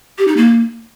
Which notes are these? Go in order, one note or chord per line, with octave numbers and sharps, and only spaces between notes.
G4
D#4
A#3